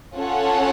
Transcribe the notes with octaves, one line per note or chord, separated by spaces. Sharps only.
C#4 F4 A4 C#5 F#5